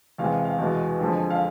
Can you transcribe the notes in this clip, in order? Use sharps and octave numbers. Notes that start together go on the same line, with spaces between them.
E2 C3 G#3 F5
F5
F5
E2 B2 G#3
F2 D3 F3 G#3
F5